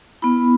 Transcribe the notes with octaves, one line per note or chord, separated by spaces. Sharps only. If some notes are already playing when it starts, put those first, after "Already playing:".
B3 E4 B5